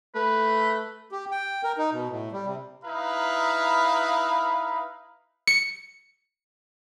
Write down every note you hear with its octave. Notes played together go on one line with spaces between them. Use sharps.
A3 B4
G4
G5
A#4
D#4
B2
A2
G3
C3
D#4 E4 B4 F5 A#5 B5
C#7